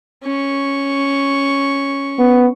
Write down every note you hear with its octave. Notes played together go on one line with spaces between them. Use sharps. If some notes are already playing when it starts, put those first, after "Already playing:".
C#4 C#6
B3